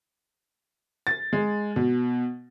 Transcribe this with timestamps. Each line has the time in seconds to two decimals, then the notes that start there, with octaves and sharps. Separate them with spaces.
1.07 A6
1.33 G#3
1.76 B2